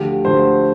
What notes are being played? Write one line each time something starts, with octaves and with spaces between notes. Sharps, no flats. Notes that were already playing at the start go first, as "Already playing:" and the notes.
Already playing: D2 D3 F3 A3 G4
D2 D3 F3 A3 C5